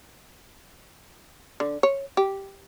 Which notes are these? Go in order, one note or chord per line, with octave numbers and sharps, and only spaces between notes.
D3
C#5
G4